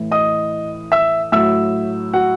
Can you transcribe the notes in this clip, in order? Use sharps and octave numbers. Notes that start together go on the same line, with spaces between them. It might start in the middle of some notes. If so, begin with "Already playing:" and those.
Already playing: A2 E3
D#5 D#6
E5 E6
A2 F#3 E5 E6
F#4 F#5